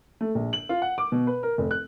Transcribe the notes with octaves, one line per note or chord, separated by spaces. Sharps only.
A3
A#1
F#7
F4
F#5
D6
B2
B4
A#4
F1
F#6